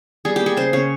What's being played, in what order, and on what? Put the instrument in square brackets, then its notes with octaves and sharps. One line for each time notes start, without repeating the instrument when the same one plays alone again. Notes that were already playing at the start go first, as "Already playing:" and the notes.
[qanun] G3 G#4
A#3 G4
G#4
C#3 C5
C#3 C#5